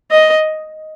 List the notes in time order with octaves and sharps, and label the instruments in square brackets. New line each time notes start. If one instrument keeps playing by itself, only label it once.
[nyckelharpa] D#5